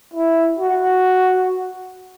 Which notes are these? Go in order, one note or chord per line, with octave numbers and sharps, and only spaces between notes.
E4
F#4